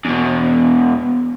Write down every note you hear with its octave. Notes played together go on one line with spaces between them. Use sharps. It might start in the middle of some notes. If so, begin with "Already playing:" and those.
E2 B2